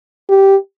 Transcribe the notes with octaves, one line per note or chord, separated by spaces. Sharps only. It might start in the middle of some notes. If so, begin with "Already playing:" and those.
G4